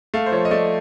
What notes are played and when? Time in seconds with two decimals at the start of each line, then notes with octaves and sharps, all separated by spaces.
0.14 A3 F5
0.26 C5
0.32 F3 C#5
0.45 D#5
0.51 A3 D5